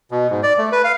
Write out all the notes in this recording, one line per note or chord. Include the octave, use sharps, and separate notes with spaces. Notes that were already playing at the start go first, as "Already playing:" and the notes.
B2
G#2
D5
A3
B4
F5